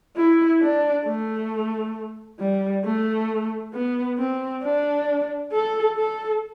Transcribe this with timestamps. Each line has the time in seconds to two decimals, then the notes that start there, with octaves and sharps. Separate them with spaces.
0.16 E4
0.62 D4
1.06 A3
2.40 G3
2.85 A3
3.74 B3
4.18 C4
4.63 D4
5.53 A4
5.97 A4